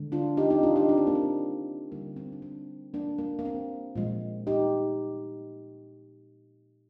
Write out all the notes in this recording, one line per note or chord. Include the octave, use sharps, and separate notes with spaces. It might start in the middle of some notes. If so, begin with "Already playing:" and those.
Already playing: D3 G#3
D4 F4
D#4 G4
C4 D#4
D4 F4
D#4 G4
D4
C4
A#3
C4
D3 G3 A#3
C4
D4
C4
A#3 D4
A#3
A#3
C4
A#2 F3 G#3
D#4 G4